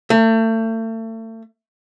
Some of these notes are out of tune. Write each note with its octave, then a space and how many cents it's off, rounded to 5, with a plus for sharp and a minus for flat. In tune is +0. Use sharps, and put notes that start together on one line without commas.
A3 +35